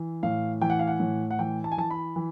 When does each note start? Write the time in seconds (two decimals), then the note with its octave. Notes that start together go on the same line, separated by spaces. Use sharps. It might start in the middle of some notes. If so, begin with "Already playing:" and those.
Already playing: E3
0.23 A2 F5
0.61 E3 G5
0.70 F#5
0.79 F5
0.87 F#5
1.00 A2
1.31 F#5
1.39 E3 G5
1.64 A5
1.72 G#5
1.77 E3 A5
1.90 B5
2.16 E3